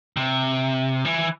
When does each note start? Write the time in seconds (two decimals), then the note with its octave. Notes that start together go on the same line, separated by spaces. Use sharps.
0.17 C3
1.05 E3